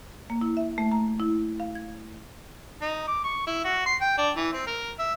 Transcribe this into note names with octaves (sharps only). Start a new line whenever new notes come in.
A#3
E4
E5
A3
A#5
E4
F5
G#6
D#4
D6
C#6
E4
F#4
C6
G5
D4
E3
C4
A#4
E5